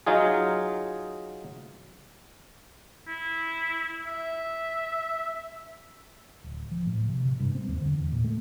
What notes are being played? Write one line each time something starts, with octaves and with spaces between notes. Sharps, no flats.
F#3 D#4 F4 G#4
E4
E5
D1
F3
A2
C3
C3
G2
C4
D#2
D3
E2
A#2
A3